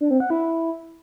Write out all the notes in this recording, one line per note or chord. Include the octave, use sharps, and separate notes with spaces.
D4
C4
F#5
E4